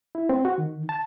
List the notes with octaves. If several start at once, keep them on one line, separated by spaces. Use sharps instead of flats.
E4
C4
F#4
D#3
A5